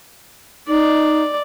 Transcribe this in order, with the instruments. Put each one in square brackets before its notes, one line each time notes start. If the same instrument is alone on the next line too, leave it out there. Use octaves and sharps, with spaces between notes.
[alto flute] D#4 [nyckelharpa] D5